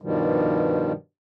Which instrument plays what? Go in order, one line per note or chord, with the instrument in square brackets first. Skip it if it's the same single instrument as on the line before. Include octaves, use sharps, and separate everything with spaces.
[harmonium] G2 B2 D#3 F3 G3